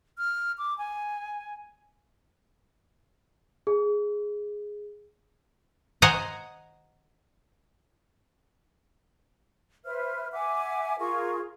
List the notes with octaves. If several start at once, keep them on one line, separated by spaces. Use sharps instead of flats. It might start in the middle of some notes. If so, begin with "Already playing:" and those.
F6
D6
G#5
G#4
C5 D#5 F#5 G#5 A#5
B4 C5 E5 F6
E5 F#5 G#5 D6
F4 G#4 A#4 C#6